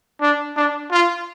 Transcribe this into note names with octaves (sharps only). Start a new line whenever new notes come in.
D4
D4
F4